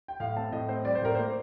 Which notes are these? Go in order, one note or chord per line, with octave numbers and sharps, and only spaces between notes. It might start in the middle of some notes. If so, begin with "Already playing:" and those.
G5
A2 F5
C4 A5
A2 D#5
C4 C5
G3 D5
C5
A2 A#4
A#3 C5